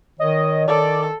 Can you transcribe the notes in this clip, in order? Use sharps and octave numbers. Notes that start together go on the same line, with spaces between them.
D#3 C#5 D#5
D#3 A4 D5